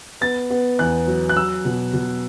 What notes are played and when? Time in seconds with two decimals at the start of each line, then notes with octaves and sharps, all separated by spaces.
0.21 B3 A6
0.50 B3
0.79 E2 F#6
1.07 F#3
1.29 F#6
1.35 F#3 E6
1.65 B2
1.93 B2